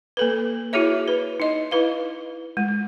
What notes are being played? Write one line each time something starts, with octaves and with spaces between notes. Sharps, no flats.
A#3 A4 B4
E4 F#4 G#4 C#5 E5
B4
D#4 D#5
E4 B4 F5
G#3